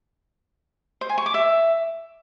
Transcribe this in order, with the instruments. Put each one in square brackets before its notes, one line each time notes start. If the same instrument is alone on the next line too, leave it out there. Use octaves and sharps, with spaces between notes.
[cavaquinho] C5
G#5
C#6
D6
E5